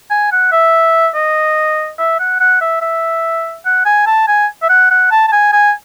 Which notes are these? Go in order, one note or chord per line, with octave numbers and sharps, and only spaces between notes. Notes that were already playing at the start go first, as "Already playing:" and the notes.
G#5
F#5
E5
D#5
E5
F#5
F#5
E5
E5
F#5
G#5
A5
G#5
E5
F#5
F#5
A5
A5
G#5
G#5